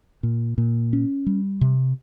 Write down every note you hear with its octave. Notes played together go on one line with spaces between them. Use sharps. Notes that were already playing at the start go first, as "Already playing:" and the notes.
A#2
A#2
C#4
G3
C3